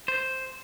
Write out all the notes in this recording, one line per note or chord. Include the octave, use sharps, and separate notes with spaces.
C5